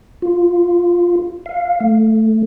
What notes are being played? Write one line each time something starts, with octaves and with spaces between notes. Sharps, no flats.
F4
F5
A3